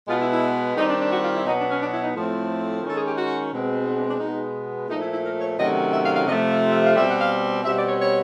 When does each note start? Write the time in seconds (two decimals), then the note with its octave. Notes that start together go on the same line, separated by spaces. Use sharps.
0.08 B2 G#3 B3 F4
0.20 E4
0.31 E4
0.76 D#3 G3 C4 D#4
0.88 D4
0.99 D4
1.11 F#4
1.22 F4
1.34 E4
1.45 B2 F#3 B3 D#4
1.57 D4
1.69 C#4
1.80 D4
1.91 E4
2.02 D#4
2.14 A2 F3 A3 C4
2.83 D#3 G#3 C#4 A4
2.95 G#4
3.06 G4
3.17 F#4
3.52 B2 G#3 C4
3.86 D#4
3.97 D4
4.09 D4
4.20 B2 G#3 B3 D#4
4.89 A#2 F3 A3 D#4
5.01 E4
5.12 E4
5.24 A#4
5.40 C#5
5.58 C3 D#3 F#3 A3 C#4 D#5
5.92 E5
6.04 F5
6.15 F5
6.26 C3 F3 A3 D#5
6.38 E5
6.49 F5
6.72 E5
6.84 F5
6.95 B2 G3 C4 E5
7.07 F#5
7.18 F5
7.64 B2 G3 C4 E5
7.76 D5
7.87 C#5
7.98 C#5